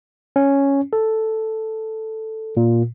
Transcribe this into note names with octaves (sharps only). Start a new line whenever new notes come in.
C#4
A4
A#2